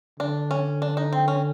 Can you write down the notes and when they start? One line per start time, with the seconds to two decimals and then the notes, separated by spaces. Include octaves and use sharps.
0.20 D3 D4
0.51 C#4
0.82 D4
0.97 D#4
1.13 C4
1.28 C#4